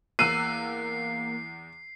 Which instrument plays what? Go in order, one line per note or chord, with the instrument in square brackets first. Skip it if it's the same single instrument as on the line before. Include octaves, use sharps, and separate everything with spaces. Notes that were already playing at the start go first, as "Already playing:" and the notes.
[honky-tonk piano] E2 E6 F#6 [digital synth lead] A#3 [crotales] C7 [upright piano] D#7